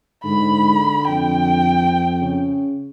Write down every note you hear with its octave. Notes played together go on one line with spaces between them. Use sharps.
G#2 D3 B5
F2 G5
C#3